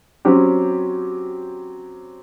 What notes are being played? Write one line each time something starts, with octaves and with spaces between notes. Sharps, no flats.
F#3 C4 C#4 G4